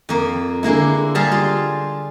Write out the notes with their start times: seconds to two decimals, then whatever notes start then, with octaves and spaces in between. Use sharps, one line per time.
0.09 F2 A#3
0.63 D3 G#3 A#3 E4
1.15 G3 G#4 F5 A5 A#5
1.32 F4